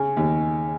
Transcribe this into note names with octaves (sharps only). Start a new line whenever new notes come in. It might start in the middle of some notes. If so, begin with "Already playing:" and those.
Already playing: C#3 G#5
D#2